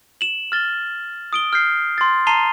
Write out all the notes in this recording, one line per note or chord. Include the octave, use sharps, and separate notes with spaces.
E7 F#7
F6 A6 G7
D#6 D7 G7
F6 G6 C7
C6 A6
A5 A#5 C7 D#7 F7 G7